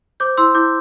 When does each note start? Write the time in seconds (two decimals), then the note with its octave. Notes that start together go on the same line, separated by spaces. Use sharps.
0.20 C5 D6 G6
0.37 E4 C6 E6
0.55 E4 D6 G6